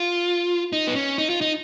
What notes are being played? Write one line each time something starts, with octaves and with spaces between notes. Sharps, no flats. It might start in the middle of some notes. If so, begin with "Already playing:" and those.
Already playing: F4
D#4
B3
C#4
D#4
F4
D#4